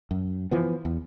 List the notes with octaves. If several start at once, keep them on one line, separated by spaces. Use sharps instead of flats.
F#2
E3 F3 B3
E2